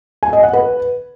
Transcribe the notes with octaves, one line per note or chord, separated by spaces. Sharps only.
G#5
D#5
F#5
B4